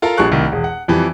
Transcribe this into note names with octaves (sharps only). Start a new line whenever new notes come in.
F4 A4 A#4 F5
A#1 G3 G#4 C#6 F#6
C2 A2 D#3
E1
F#5
F2 E3 G3